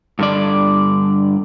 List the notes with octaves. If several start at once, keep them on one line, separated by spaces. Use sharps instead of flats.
G2 D3 D5